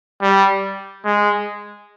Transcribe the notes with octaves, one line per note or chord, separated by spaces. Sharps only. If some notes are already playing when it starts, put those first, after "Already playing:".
G3
G#3